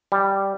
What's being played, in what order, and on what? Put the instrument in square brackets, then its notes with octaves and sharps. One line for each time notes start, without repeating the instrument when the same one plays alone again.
[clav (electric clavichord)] G3